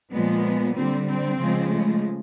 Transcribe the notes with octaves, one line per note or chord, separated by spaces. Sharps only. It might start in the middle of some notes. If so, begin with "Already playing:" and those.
A#2 F3 G#3 B3
D3 G3 C4
C4
C#3 F3 G#3
A3